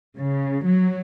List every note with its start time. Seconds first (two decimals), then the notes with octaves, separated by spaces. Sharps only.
0.16 C#3
0.64 F#3